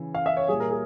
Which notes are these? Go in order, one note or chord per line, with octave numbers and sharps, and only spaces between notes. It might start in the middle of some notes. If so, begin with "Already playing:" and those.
Already playing: C#3 E3
F5
E5
C#5
A#2 G3 G#4
A#4
G#4